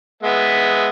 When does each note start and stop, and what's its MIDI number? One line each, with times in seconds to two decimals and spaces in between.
0.23 0.89 56
0.23 0.89 59
0.23 0.89 76